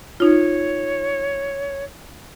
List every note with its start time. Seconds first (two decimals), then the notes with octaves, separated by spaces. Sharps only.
0.20 D#4 F4 C#5